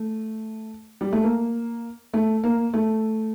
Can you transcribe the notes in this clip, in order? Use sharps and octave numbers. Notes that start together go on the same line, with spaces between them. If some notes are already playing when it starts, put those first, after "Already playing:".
Already playing: A3
G3
A3
A#3
A3
A#3
A3